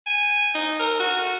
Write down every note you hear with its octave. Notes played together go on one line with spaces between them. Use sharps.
G#5
D#4
A#4
F#4